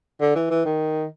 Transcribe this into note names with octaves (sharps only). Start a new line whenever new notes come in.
D3
E3
E3
D#3